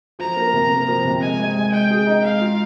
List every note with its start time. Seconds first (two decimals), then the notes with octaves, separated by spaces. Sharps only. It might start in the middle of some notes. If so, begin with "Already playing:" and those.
0.19 F3 A#5
0.36 A#3
0.53 C3
0.71 A#3
0.88 F3
1.05 C3
1.22 G#3 G#5
1.39 G#3
1.57 G#3
1.72 G#3 G5
1.90 G#4
2.07 D#4
2.24 G#3 F5
2.41 F4